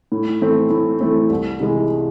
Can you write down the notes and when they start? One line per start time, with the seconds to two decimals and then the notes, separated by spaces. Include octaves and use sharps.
0.12 A2
0.41 E3 A3 C4
0.70 A2
1.00 E3 A3 C4
1.30 C2
1.60 C3 E3 G#3